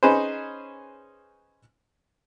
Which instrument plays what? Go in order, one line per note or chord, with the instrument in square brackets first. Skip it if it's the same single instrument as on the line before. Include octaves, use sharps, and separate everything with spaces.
[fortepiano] C#4 D#4 G#4 B4 C5